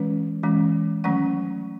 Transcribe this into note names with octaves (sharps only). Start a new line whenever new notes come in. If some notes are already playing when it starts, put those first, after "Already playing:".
Already playing: E3 G#3 C#4 B4
E3 G#3 C#4
D#3 F#3 A3 C#4 F#5